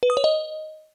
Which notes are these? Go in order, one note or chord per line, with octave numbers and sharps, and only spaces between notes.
B4
D#6
C#5
D#5